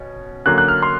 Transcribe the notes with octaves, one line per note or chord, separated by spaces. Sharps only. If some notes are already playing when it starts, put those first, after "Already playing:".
Already playing: B2 C#4
D3 F#3 A#3 C#4 F#6
F#6
F6
C6